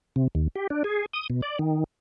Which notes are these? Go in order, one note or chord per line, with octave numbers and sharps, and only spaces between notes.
C3
D#2
G4
D4
G#4
D#6
B2
D5
D#3